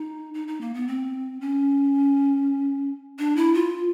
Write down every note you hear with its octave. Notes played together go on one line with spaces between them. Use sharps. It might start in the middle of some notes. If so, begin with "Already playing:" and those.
Already playing: D#4
D#4
D#4
A#3
B3
C4
C#4
D4
E4
F4